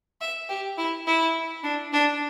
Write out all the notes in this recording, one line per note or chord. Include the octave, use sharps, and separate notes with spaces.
E5
G4
E4
E4
D4
D4